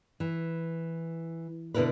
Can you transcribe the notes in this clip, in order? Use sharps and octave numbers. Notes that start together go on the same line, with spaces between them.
E3
B2 D3 E4 A#4 B4